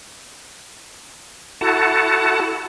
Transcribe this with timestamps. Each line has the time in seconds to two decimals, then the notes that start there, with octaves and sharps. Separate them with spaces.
1.61 E4 F#4 A4 F#5 A5